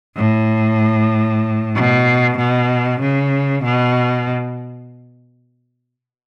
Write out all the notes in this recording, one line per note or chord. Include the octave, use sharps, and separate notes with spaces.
A2
B2
B2
C#3
B2